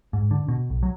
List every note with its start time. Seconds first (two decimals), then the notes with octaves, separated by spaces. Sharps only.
0.13 G#2
0.31 D3
0.48 B2
0.70 B1
0.83 F#3